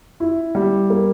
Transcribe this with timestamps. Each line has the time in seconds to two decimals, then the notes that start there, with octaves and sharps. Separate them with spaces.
0.20 E4
0.55 G3
0.90 A#3